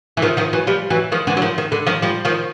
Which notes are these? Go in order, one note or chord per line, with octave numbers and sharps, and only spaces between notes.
E3
D#3 F3
D#3 F3
E3 F#3
F3 G3
E3 F#3
D#3 F3
D3 E3
F#3
D#3 F3
D#3
D3
D#3 F3
F3 G3
D#3 F3